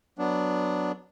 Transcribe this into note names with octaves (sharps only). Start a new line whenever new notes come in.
F#3 B3 D4